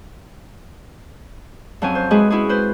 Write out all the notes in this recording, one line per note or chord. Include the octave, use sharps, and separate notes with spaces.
F2 F#3 C4 C#4 G#5
C5
G#3 E4 F#4 G#4 B4
C#4 E4 F#4 G#4
B4 C5